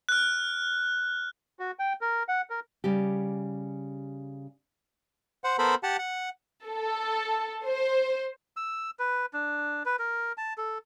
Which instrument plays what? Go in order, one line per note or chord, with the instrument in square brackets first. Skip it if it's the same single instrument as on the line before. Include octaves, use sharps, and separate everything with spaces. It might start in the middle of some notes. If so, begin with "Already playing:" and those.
[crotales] F6 F#6
[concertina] F#4
G5
A#4
F#5
A#4
[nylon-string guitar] C#3 G3 G4
[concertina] C5 F#5
B3 A4 A#4 C5 B5
G4 F#5 A5
F#5
[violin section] A4
C5
[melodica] E6
B4
D4
B4
A#4
A5
A4